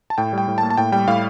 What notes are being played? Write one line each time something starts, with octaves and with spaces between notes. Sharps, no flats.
A5
A2 G5
G3 G5
A2
A5
A#3
A5
A2 G5
G3 G5
A2 F5